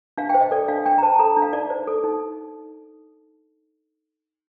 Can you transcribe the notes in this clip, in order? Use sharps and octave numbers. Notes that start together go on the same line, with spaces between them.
D4 F5
G5
C5
D#5
A4 D5
D4 F5
D4 G5
A#5
C5 A5
A5
A4 A#5
D4
F5
D#4 D5
C5
A4
D#4